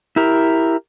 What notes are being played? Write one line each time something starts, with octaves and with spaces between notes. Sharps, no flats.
E4 G4 A#4